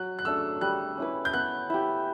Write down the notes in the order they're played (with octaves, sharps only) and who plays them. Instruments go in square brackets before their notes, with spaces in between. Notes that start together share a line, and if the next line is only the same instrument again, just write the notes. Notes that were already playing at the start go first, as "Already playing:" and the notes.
Already playing: [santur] F#3 [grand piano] F#6
[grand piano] F#6
[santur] A3 D4 A4 [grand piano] E6
[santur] G3 [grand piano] F#6
[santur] C#4 E4 B4
[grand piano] G6
[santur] B3 [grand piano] F#6
[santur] E4 G4